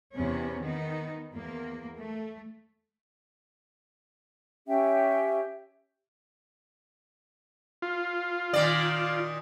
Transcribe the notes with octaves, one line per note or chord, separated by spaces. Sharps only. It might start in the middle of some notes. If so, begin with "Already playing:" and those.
E2 C3 B3 C#4
D#3 B3 D#4
E2 A#3
A3
C#4 G4 E5 G5
F4
A#2 D#3 D5